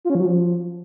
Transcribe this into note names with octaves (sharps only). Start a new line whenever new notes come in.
F4
C#4
F3
F#3
F3